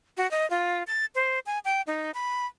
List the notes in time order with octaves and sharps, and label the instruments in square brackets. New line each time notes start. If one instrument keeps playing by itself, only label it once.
[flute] F#4
D#5
F4
A6
C5
G#5
G5
D#4
B5